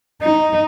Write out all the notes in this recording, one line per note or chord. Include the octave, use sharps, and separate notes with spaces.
D#4